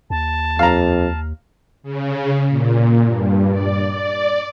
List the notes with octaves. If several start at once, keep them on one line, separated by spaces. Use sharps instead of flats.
D#2 A5
F2 F5 A#5
C#3
A#2
G2
D5
D5